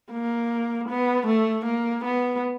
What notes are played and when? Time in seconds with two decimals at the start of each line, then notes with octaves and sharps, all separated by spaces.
0.12 A#3
0.89 B3
1.27 A3
1.66 A#3
2.05 B3